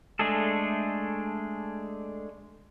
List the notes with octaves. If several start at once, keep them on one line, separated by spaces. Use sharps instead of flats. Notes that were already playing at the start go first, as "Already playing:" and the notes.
G#3 A3 D4 G#4 A4